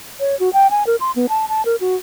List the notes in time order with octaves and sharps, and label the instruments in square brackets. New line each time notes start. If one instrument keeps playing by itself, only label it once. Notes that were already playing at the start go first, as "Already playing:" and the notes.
[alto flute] C#5
F#4
G5
G#5
A#4
C6
B3
A5
A5
A#4
F#4